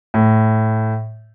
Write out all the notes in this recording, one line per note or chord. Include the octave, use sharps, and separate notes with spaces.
A2